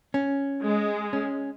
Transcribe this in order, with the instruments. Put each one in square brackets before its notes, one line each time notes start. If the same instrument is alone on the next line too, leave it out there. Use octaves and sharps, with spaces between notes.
[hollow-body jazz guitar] C#4
[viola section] G#3
[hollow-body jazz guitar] C#4